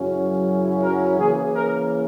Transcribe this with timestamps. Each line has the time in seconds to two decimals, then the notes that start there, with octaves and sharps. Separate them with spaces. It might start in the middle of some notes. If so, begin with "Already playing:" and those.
Already playing: F#2 C#3 F#3 C#4 E4
0.82 A#4
1.18 C#3 E3 A#3 G#4
1.55 A#4